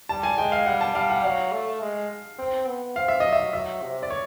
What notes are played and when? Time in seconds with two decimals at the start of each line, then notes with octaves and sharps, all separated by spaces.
0.09 G3 A5
0.23 G#5
0.38 G#3 G5
0.52 F5
0.66 G3 F#5
0.81 A5
0.95 G3 F5
1.10 F#5
1.24 F#3 F5
1.53 A3
1.82 G#3
2.39 C4
2.67 B3
2.96 C4 F5
3.08 E5
3.20 F#3 D#5
3.33 E5
3.53 F#3 E5
3.82 C3
4.03 D5
4.10 C#5